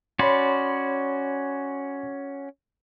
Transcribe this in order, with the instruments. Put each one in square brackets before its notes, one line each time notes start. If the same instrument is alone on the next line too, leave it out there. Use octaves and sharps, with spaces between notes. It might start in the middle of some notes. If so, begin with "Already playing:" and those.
[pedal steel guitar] C#4 F#4 D5 [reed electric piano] C#5 B5 C6